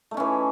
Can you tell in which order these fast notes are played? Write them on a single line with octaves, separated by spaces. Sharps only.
A3 D#4 C#4 E3